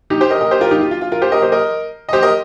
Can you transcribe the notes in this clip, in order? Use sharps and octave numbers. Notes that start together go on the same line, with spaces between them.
D#4 G4
G4 C5
A#4 D#5
A#4 D#5
G4 C5
F4 A#4
D#4 G4
F4
F4
F4
F4 A#4
G4 C5
A#4 D#5
G4 C5
A#4 D#5
D#5
G4 C5
A#4 D#5